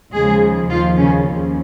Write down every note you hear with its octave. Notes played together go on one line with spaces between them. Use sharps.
D#2 C#3 F3 G#3 G#4
D#2 D#3 F3 F4
C#3 C#4
D#2 C#3 F3